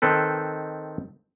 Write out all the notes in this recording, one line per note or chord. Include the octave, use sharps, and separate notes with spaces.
D#3 C4 A4 B4